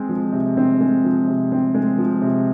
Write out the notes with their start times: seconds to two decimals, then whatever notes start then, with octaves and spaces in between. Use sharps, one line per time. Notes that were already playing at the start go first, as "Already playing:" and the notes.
Already playing: G#3 C4
0.09 F3
0.33 C3
0.57 C4
0.81 G#3
1.05 F3
1.28 C3
1.52 C4
1.75 G#3
1.98 F3
2.22 C3